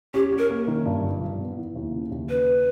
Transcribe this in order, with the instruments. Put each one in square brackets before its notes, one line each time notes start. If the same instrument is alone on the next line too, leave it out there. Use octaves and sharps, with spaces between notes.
[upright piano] C#4 [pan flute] G4
[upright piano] C#4
[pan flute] A#4
[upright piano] A#3
D#3
G2
G1
G2
B3
E3
D#2
C#3
D#2
[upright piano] C#4 [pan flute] B4